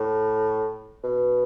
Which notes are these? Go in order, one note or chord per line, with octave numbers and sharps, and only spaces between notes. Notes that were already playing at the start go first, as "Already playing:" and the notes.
Already playing: A2
B2